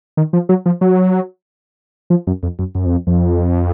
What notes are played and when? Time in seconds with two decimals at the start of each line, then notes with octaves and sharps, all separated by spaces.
0.17 D#3
0.33 F3
0.49 F#3
0.66 F3
0.81 F#3
2.10 F3
2.27 F#2
2.43 F2
2.59 F#2
2.75 F#2
2.86 F2
3.07 F2